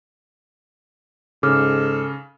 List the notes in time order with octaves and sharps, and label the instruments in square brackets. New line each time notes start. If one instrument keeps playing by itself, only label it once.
[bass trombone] G#2 [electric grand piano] C#3 [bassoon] A4 [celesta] D6 F6